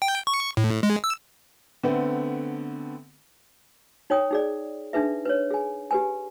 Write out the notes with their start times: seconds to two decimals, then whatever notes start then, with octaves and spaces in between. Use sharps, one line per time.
0.02 G5
0.27 C#6
0.57 A2
0.83 G#3
1.04 E6
1.83 D3 A3 B3 C4
4.10 D#4 C#5 G5 D#6
4.31 D#4 G#4 D5
4.93 D4 D#4 G#4 B4 E5
5.25 B4 C#5
5.51 G#4 G#5
5.91 G4 B4 G#5